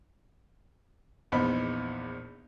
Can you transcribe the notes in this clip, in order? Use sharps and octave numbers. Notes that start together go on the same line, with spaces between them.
A#1 E2 B3 D#4 C5 B5